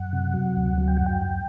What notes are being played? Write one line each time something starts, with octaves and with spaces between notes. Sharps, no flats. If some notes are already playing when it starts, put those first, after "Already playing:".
Already playing: F#2 F#5
C3
F#3
D2
F#3
G5
F#2 F#5
G5
F#2